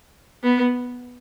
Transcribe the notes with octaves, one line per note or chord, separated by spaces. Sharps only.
B3